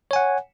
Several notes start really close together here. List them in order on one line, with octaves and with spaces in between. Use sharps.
C#5 G#5 F#5